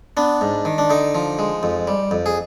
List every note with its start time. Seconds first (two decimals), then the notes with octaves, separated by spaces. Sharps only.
0.17 B3 D4
0.41 G#2
0.65 D#3
0.78 D4
0.90 D3 D#4
1.15 F3
1.39 G#3
1.63 F2
1.87 G3
2.11 F2
2.26 G#4